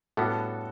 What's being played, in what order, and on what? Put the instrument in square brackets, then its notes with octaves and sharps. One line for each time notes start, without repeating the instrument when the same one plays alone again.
[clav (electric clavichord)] A2 G3 B3 D4 [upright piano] F#4 A4